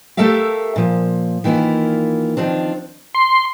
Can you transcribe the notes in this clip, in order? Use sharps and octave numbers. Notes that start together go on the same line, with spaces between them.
A3 G4 A4 A#4 E5 F5
A#2 F3
D#3 E3 A#3 E4 F4
D#3 F3 C4 D4
C6